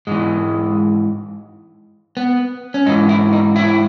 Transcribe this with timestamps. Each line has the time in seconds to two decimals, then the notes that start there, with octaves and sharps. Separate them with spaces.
0.07 G#2 E3 G#3
2.17 B3
2.74 C#4
2.86 G#2 E3 D#4
3.09 E4
3.33 D#4
3.56 E4